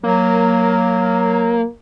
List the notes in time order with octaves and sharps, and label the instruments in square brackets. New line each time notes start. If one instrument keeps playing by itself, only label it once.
[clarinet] F#3 [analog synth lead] A#3